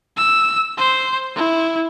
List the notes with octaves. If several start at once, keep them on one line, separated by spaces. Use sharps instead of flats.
E6
C5
E4